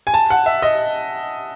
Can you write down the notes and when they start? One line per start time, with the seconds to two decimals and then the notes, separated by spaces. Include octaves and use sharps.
0.07 G#5
0.14 A5
0.30 F#5
0.46 E5
0.62 D#5